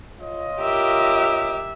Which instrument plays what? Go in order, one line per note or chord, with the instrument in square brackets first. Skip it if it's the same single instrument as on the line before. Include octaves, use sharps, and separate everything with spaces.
[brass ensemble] F4 C#5 D#5
[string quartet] G4 A#4 [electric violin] E5